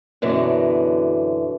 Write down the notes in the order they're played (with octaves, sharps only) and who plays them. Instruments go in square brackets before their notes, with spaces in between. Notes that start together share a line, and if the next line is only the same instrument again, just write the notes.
[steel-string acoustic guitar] F#2 B2 D3 E3 F#3